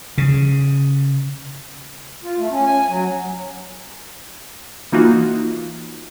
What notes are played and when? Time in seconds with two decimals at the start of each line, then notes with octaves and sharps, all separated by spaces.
0.18 C#3
2.23 F4
2.39 A3
2.51 C#4
2.66 G#5
2.89 F#3
4.92 E3 A#3 D#4 F4 F#4